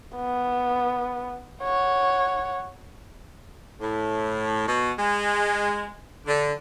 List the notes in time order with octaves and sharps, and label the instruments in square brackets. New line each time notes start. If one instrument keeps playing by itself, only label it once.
[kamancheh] B3
C#5 F#5
[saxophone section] A2
B2
G#3
D3